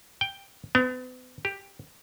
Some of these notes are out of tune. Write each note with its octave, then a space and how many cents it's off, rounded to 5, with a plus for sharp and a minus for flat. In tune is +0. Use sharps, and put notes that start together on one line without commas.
G5 +5
B3 +40
G4 +5